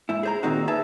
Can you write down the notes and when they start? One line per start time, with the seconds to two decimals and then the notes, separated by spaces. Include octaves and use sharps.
0.09 G#2 E4
0.23 G#4 C5 A#5
0.43 A#2 D#3 C4 D#4 F#4
0.68 G#4 B4 E5 A5